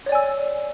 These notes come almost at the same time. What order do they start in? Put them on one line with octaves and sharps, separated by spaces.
C#5 D5 G#5 E6